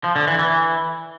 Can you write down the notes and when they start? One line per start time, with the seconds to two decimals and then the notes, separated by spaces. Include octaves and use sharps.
0.04 F3
0.16 D3
0.27 E3
0.39 E3